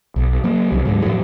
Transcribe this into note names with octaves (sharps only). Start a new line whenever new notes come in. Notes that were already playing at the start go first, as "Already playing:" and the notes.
B1
F#3 A#3
C2 F#3
D2 G#2 F#3
F2 A2 F#3